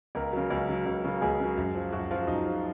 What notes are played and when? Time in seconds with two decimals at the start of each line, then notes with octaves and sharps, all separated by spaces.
0.15 C#2 A#4
0.33 C#3 F#3
0.50 C#2
0.69 C#3 F#3
0.86 C#2
1.04 C#3 F#3
1.22 C#2 G#4
1.40 C#3 F#3
1.57 F#2
1.75 F3
1.92 F#2 F#4
2.11 F3 F4
2.27 F#2 D#4
2.45 F3